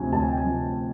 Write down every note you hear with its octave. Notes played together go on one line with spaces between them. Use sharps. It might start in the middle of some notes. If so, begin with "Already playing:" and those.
Already playing: D2 C3 F3 G#5
D2 A5
G#5
G5
G#5
C3 F3